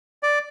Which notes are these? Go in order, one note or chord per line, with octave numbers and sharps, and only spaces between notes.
D5